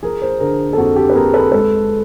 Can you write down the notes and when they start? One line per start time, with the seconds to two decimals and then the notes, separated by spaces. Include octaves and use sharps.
0.03 F3 G#4 A#4
0.22 A#4 C5
0.40 D3 G#4 A#4
0.73 A4
0.77 F2 F#4 G#4
0.96 G4 A4
1.10 B4
1.15 F2 G#4 A#4
1.34 A4 B4
1.52 G#3 A4 B4